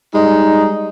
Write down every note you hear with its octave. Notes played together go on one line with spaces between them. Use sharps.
G3 G#3 D#4